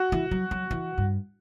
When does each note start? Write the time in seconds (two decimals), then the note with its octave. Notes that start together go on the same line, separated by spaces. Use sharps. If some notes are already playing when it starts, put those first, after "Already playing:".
Already playing: F#4
0.12 E3
0.31 F#3
0.51 F#3
0.71 E3
0.98 G2